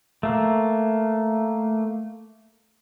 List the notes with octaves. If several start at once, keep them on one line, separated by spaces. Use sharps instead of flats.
A3 A#3